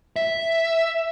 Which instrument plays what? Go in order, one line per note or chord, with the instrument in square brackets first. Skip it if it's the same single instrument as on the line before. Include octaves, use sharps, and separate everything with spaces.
[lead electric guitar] E5